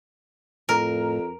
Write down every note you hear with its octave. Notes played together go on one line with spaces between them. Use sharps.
F2 A2 A#4